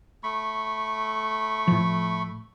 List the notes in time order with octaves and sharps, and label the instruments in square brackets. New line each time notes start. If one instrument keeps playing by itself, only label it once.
[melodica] A3 B5 C#6
[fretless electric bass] A2 F3